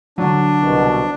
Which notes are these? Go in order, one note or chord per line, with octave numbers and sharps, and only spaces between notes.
D3 F#3 D4
C2 B2